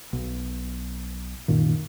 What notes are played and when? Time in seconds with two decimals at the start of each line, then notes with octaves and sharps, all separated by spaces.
0.13 B1
1.48 C2 F#2 A#2 D#3